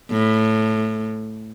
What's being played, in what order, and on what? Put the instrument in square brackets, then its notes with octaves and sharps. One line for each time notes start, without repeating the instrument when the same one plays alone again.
[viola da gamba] A2